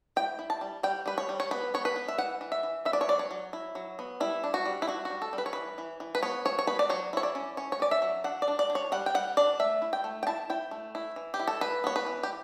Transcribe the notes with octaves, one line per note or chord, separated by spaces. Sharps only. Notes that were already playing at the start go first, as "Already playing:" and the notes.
E4 G5
E4
A5
G3
G3 G5
G3 B4
C#5
G3
C#5
B3 B4
B3 C#5
B4
B3
E5
E3 F#5
E3
E5
E3
B3 E5
D5
C#5
F#3 D5
C#5
F#3
E4
F#3
B3
G3 E4
D4
F#4
G3
E4
D4 F#4
F#4
G3
A4
G3
B4
C#5
E3 B4
E3
E3
B4
B3 C#5
E3 C#5
C#5
B3 B4
D5
F#3 C#5
E4 C#5
D5
C#4
C#4 C#5
C#5
C#4 D5
E5
F#3
D4 F#5
D5
D4
D5
D4
C#5
G3 F#5
G5
G3 F#5
D4 D5
A3 E5
E4
G5
A3
G5
E4 A5
E4 G5
A3
E4
E3
G4
E4
A4
E3 B4
B3 C#5
B4
E3
G4